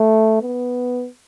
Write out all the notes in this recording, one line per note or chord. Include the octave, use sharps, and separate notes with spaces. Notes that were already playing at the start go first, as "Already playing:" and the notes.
Already playing: A3
B3